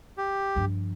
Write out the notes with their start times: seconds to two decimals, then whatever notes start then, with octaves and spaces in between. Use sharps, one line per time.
0.18 G4
0.56 G2 F3